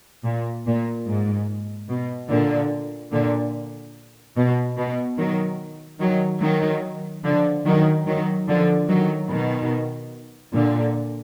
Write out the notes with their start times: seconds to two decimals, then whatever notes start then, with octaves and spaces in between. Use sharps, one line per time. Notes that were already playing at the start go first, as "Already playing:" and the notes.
0.24 A#2
0.66 A#2
1.06 G#2
1.89 B2
2.30 A#2 D3
3.12 A#2 D3
4.36 B2
4.78 B2
5.18 D#3 F#3
6.00 D#3 F#3
6.42 D#3 F#3
7.24 D3 F3
7.65 D#3 F#3
8.06 D#3 F#3
8.48 D3 F3
8.88 D#3 F#3
9.30 B2 D#3
10.53 A#2 D3